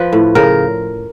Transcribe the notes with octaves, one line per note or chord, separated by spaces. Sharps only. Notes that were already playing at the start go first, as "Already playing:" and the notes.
Already playing: F3 B4
A2
C#3 A#4